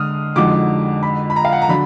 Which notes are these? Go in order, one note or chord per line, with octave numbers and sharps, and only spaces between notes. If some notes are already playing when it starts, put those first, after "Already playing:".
Already playing: D3 G#3 D#6 F6
F2 D3 G#3 D#4 F#4 D6
B5
B5
A#5
F5
F#5
A#5
D3 F#3 D4 B5